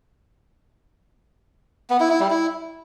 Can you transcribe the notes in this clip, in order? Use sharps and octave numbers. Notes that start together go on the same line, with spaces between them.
B3
E4
E4
G3
E4